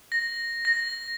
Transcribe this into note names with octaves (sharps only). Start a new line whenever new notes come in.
A#6
A#6